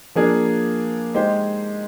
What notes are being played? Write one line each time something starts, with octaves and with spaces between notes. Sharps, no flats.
F3 A#3 D4 G#4
G#3 D#4 G4 C5